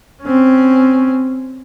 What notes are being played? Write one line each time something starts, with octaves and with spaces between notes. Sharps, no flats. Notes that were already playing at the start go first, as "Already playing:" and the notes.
C4 C#4